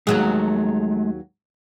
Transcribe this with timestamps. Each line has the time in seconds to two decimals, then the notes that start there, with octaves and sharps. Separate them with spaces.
0.07 D#2 F#3 G#3 A3 G#4 A#5